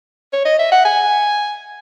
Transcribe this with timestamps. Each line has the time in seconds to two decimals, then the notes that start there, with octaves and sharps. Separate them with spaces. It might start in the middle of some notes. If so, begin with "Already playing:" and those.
0.33 C#5
0.45 D#5
0.59 E5
0.72 F#5
0.85 G#5